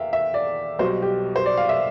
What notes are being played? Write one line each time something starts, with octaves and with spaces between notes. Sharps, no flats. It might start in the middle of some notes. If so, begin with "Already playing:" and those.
Already playing: E2 E5 F5 G5
E5
D5
B1 B2 G3 C5
G4
C5
D5
F5
E5